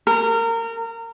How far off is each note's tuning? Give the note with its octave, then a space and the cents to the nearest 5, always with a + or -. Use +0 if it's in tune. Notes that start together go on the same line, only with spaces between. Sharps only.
A#4 -25